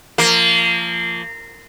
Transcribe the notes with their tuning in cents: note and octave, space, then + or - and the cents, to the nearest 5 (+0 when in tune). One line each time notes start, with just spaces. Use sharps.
F3 -20 A#3 -25